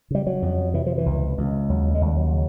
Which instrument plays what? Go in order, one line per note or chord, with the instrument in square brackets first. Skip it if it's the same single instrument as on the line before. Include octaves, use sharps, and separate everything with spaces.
[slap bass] C#3 G3
F#3
F2
C3 E3
F3
E3
C#2
C#2
D#2 F#3
G#3
D#2
G3
F#3
C#3